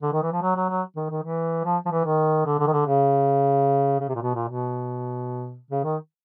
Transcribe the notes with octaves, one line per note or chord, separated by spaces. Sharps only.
D3
D#3
E3
F3
F#3
F#3
F#3
D#3
D#3
E3
F3
F3
E3
D#3
D3
D3
D#3
D3
C#3
C#3
C3
A#2
B2
A#2
B2
C#3
D#3